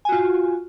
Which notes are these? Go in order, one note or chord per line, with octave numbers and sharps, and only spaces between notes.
F4 F#4 G#5